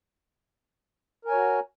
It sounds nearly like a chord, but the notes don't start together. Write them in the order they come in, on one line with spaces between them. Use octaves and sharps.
A#4 G#5 C#5 F#4